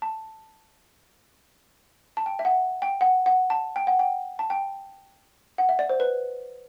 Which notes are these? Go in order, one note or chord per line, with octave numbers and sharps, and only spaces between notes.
A5
A5
G5
E5
F#5
G5
F#5
F#5
A5
G5
F#5
G5
A5
G5
F#5
E5
D5
C5
B4